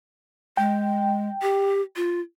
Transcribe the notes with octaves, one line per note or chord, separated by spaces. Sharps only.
G#3 G5
G4
F4